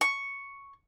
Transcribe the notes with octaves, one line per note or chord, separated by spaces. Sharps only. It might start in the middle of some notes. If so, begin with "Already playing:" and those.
C#6